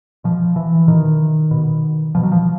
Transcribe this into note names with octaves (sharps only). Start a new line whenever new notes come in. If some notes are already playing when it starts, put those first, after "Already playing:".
B2 F3
E3
B2 D#3
B2
B2 F3
F#3
F3